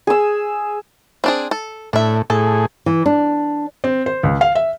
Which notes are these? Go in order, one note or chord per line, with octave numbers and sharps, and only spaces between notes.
G#4 E6
C4 D4 G#4
A4
A2 D4 E5
A2 G#4 A4
E3
D4
C4
C5
C#2
F5
E5